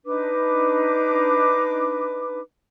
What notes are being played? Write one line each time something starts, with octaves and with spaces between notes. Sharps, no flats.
D4 D#4 B4 D6